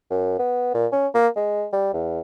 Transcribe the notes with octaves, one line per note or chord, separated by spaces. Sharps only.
F#2
B3
A#2
C#4
A#3
G#3
G3
E2